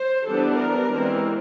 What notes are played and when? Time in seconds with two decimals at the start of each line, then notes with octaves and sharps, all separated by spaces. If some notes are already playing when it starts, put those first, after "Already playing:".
Already playing: C5
0.25 E3 G3 B3 D4 A4
0.57 A#4
0.88 E3 G#3 C4